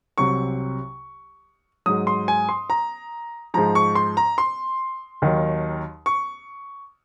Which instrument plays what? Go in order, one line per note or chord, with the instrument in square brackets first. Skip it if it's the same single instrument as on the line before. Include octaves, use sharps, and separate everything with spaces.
[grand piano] C2 C3 F#3 C#6
G#2 F#3 D#6
C6
G#5
C6
A#5
G#2 F3 A#5
C#6
C6
A#5
C6
D#2 D#3 F#3
C#6